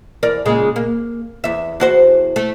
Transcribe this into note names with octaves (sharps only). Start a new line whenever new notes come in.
E2 A#4 D5
A#2 C#3 G#3
A#3
E2 E5
E2 F#4 C5
A3